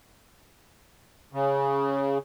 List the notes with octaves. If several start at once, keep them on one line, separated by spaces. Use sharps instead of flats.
C#3